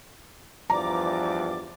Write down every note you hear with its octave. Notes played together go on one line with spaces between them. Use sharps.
E2 G2 F3 D5 A#5 D6